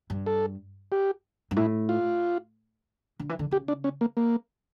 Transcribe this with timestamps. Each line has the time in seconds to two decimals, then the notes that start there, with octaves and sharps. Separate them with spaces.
0.10 G2
0.26 A4
0.92 G4
1.51 G2
1.56 A2 E4
1.89 F4
3.19 D3
3.29 E3
3.39 D3
3.51 C#3 G4
3.68 D4
3.84 C#4
4.01 A#3
4.17 A#3